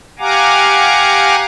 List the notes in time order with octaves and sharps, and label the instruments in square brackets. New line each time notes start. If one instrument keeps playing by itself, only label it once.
[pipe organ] G4 F5 F#5 G#5 A#5 D6